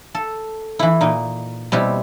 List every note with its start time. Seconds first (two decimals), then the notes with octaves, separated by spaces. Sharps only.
0.15 A4
0.79 E3 E4
1.01 A#2 D#4
1.72 B2 G3 C4 E4